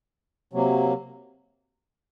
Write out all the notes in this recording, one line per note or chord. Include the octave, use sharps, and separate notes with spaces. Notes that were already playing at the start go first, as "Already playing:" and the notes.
C3 F#3 A#3